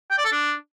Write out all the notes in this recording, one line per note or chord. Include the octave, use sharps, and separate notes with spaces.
G5
D5
A4
D4